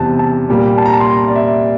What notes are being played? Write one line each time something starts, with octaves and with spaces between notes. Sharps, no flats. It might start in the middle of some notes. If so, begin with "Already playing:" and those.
Already playing: E2 C3 G3 C4 A5
A5
A#2 G3 A#3
A5
A#5
A5
C6
A#5
D5
E5